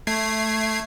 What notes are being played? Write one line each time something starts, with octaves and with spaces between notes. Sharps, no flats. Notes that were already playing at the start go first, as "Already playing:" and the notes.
A3 G#6 C7